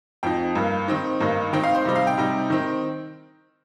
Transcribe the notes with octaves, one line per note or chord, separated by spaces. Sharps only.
F2 F3 D#4 G5
G2 G3 A#3
D#3 C4 D#4
G2 D#3 A#3 D#4
D#3 C4 D#4 G5
F5
C5
C3 G3 D#4
F5
G5
C3 G3 D#4
D#3 C4 D#4